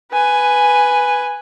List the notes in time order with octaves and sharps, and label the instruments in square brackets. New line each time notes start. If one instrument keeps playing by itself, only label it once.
[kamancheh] B4 G#5